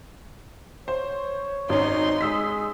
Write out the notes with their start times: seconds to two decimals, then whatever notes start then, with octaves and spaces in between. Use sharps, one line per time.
0.88 C5 C#5
1.69 G#1 C#4 D#4 C6
2.21 G#3 D#6 E6 B6